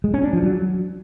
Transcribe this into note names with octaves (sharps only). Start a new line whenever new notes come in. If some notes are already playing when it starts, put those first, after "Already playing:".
G#3
C#4
D4
F3
F#3